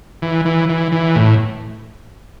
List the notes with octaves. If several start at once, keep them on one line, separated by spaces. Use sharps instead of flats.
E3
E3
E3
E3
A2